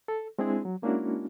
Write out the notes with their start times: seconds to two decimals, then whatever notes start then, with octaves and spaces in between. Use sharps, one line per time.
0.08 A4
0.39 G#3 C4 D4 E4 G#4
0.65 F#3
0.82 G#3 A#3 C#4 D4 E4 F#4